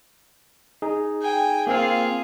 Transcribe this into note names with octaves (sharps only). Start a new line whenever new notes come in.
D#4 G#4
G5 G#5
A#3 C4 F4 G#4 F5